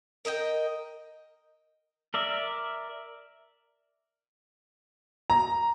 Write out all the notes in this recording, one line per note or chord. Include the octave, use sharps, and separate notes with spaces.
A#4 D#5 E5 G5
A#4 D5 E5
A#5